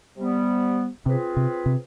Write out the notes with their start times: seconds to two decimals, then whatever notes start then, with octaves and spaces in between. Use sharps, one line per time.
0.16 C3 G3 B3
1.06 C3 C4 F4 G#4 B4
1.37 C3
1.66 C3